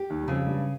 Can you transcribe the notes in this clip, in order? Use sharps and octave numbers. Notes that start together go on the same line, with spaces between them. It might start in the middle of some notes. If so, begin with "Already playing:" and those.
Already playing: G4
D#2 D#3
G3
F2 C#3 F3
G2 G3